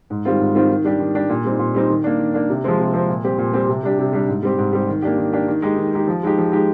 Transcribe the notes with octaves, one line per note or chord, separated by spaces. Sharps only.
G#2
D#3 G3 C4 F4
G#2
D#3 G3 C4 F4
D#3
G3 D4 G4
D#3
G3 D4 G4
A#2
G3 C4 D#4
A#2
G3 C4 D#4
D#3
A#3 D4
D#3
A#3 D4
C3
F3 G#3 C4
C3
F3 G#3 C4
A#2
G3 C4 G4
A#2
G3 C4 G4
C3
G3 D4 G4
C3
G3 D4 G4
G#2
G3 C4 G4
G#2
G3 C4 G4
D#3
A#3 D4 G4
D#3
A#3 D4 G4
D#3
G#3 D#4 G4
D#3
G#3 D#4 G4
F3
G#3 D#4 G4
F3
G#3 D#4 G4